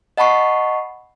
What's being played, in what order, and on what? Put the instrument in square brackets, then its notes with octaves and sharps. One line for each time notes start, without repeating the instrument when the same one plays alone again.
[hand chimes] D#5 F#5 A5 B5 C#6 C7